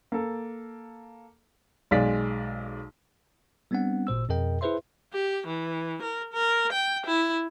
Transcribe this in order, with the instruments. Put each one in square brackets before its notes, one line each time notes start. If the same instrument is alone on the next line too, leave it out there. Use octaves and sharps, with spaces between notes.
[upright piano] A#3 A4
B1 G#3 G#4 D5 F5 B6
[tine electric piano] G3 B3 C4 D4 F#5
G#1 A#2 C5 E6
F2 B2 G#4 A#4 D#5 G5
E4 G#4 B4 C5 E5 C6
[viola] G4
E3
A#4
A#4
G5
E4